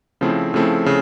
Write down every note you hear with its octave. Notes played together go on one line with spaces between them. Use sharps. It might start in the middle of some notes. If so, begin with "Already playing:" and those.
C#3 F3 A3 C4 E4
C#3 F3 A3 C4 E4
C#3